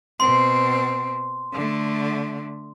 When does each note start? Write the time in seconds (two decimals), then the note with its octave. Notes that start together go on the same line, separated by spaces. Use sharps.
0.20 B2 C4 C6
1.53 D3 A3